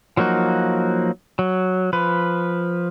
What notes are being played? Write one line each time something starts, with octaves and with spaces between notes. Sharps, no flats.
F3 F#3 A#3 D#4 F#4
F#3
F3 B4